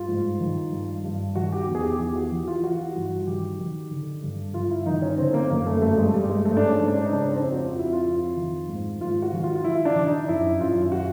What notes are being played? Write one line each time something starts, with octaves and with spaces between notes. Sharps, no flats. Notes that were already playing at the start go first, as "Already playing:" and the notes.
Already playing: G2 F4
G#2
D#3
G2
G2
D#3 F#4
G4
E2
G#4
G4
E3 G4
F#4
E3
F4
E3 F#4
G2
D#3 G4
D#3
D3
G2
G2 F4
E4
D#3 D#4
C#4
D3 C4
A#3
F#2 A#3
A3
G2 A3
G#3
G2 G3
G#3
G#2 A3
D4
C#4
G#2
D4
D#4
C#3 D4
C#4
C4
F2
F#4
F4
F2
E4
F4
F2
D#3
G#2
G#2 F4
F#4
D#3
F4
F4
D#3 E4
D4
D#3
D#4
F#2 E4
F#2 F4
F#4